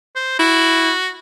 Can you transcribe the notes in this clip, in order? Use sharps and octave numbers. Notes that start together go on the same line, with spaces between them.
C5
E4 F#4